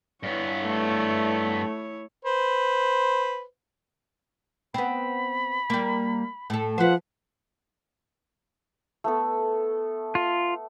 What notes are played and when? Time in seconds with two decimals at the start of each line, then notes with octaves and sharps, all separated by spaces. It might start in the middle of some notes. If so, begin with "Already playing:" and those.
0.23 G2 B3 E4 C#5
0.63 A3
2.25 B4 C5
4.74 B3 C4 B5
5.70 G3 A#3
6.50 A2 A4
6.78 F3 B4 C5 F#5
9.04 A3 B3 A4
10.15 F4